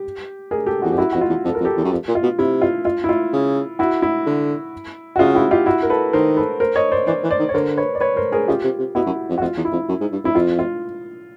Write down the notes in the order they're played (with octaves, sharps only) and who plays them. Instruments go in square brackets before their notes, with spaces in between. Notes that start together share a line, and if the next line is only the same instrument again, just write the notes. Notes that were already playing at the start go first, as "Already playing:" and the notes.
Already playing: [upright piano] G4
G#4 A#4
G4 A4
[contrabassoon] E2 [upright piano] F#4 G#4
[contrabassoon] F2 [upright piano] G4
[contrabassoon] F#2 [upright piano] E4 F#4
[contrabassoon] F2 [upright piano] F#4
[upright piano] F4
[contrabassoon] E2
[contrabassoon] F2 [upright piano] A4
[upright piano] A#4
[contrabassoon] F2
[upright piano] G4 A4
[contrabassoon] E2
F#2
F2
A#2
[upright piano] F4
[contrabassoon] B2
[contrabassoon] C3 [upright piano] E4
[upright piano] F4
F4
E4
F4
[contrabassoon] C#3
[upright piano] E4 F#4
E4
[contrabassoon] D3
[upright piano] F#4
[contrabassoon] C#3 [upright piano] F4
[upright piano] E4 F#4
F4 G4
E4 F#4
A#4
A4 B4
[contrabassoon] D#3 [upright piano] A#4 C5
[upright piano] A4 B4
A#4 C5
C#5 D#5
C5 D5
[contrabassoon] E3 [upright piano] C5 D5
[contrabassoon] E3
[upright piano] C5 D5
[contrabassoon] D#3
[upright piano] C#5
[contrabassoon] D3 [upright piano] A#4 C5
[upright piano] B4 C#5
D5
B4 C#5
A#4 C5
G#4 A#4
[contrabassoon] C#3 [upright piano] F4 G4
[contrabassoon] C3
C3
[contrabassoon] B2 [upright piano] E4 F#4
[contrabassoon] F#2
F2
[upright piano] F#4
[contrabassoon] F2 [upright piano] F4
[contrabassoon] E2
[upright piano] E4
[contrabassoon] F2
F#2
G#2
G2
[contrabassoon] F2 [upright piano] E4
[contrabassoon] F2 [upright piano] F4
[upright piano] F4